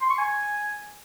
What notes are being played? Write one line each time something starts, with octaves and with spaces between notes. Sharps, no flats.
C6
C#6
G#5